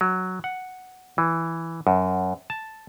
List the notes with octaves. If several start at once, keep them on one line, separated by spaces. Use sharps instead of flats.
F#3
F#5
E3
F#2
A5